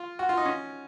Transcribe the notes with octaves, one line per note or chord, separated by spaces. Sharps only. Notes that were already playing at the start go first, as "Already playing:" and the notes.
Already playing: F4
F#4
F4
D#4
C#4